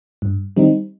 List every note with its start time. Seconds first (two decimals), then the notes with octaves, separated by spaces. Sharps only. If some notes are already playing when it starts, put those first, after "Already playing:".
0.22 G2
0.57 D#3 G3 C4 D#4